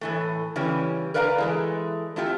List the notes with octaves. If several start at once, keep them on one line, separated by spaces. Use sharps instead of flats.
A2 E3 A3
C#3 E3 G3 C#4
A#4 B4 D5 F5 G#5 A#5
E3 G#3 A3
A3 C4 E4 F4 G4